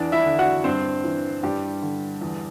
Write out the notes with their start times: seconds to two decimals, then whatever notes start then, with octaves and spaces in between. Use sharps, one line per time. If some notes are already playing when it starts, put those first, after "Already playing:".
Already playing: E2 E3 D4 D5
0.12 E4 E5
0.26 D3
0.39 F#4 F#5
0.64 G2 C4 C5
1.04 E3
1.43 G2 G3 G4
1.82 D3
2.21 E2